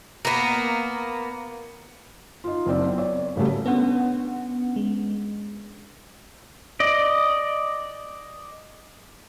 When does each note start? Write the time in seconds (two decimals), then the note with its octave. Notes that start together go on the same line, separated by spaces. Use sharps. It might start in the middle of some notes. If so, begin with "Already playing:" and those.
0.25 A#3 B3
2.44 D#4 F4
2.66 F#1 C4 D5
2.84 B3
2.98 C#5 D5
3.36 A2 C#3 F#3 G3 A3
3.66 B3 C#4 D4 B4 F#5
4.76 G#3
6.80 D5 D#5